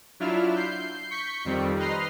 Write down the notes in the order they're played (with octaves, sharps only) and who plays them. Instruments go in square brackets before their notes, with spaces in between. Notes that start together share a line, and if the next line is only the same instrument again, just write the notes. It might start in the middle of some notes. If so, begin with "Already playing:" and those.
[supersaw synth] F#3 D4 E4 F4 E5 F6
G6 C7
C#6 G6 B6 C#7
F2 D#3 G3 C4
B4 D#5 A#5 C6 F6 C7